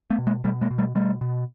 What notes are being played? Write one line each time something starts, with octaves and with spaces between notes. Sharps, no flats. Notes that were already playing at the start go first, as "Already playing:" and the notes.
A3 B3
B2
G#3 A#3
B2 G3 A3
G#3 A#3
B2
G3 A3
B2 G3 A3
B2